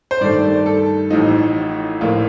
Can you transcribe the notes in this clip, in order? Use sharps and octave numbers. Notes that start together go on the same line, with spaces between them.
C5
G2 D#3 A3 D5
A4
A1 A2 F3 D#4
A#1 A2 F3 A#3 F4